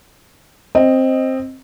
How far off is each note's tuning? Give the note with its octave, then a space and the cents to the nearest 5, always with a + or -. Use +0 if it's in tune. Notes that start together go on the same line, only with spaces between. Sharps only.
C4 +10 D#5 +0